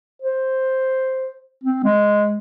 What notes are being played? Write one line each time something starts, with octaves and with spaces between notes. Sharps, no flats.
C5
C4
G#3